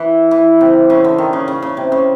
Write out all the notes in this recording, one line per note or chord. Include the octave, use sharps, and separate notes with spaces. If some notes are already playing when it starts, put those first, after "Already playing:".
Already playing: E3
E3
C3
C#3
D3
D#3
C#3
C#3
C#3
C3
C#3